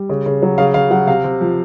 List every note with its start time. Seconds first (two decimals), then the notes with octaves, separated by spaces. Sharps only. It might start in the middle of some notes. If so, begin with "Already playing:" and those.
Already playing: G3
0.09 C#3
0.26 C#3
0.42 F#3
0.58 C#3 F5
0.74 C#3 F5
0.91 F#3 F#5
1.07 C3 F5
1.24 C3
1.41 F3